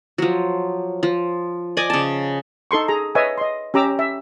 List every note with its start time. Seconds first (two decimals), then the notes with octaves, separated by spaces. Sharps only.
0.18 F3 F#3
1.03 F3
1.77 D5 D#5 G#5 D6
1.90 C#3 A5
2.71 D#4 A4 C6 C#6
2.88 G#4 A#5
3.15 B4 C#5 D#5 E5 G#5
3.38 D#5 C6
3.74 C#4 G4 A#5 D6 E6
3.99 E5